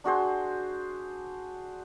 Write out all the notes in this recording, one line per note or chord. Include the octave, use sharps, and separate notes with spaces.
D4 F#4 G#4 C5